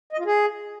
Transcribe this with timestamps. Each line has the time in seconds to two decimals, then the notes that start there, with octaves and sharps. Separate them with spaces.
0.13 D#5
0.19 F4
0.26 G#4